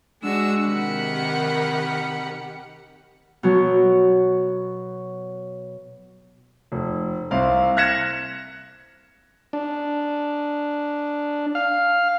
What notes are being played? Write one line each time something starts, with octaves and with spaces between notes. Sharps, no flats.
G#3 D4 F#4 E6
C3 D#3 G4 A#4 F#5 B5
B2 F#3
F1
C2 C4 F5
F6 F#6 G#6 A#6 C#7 E7
D4
F5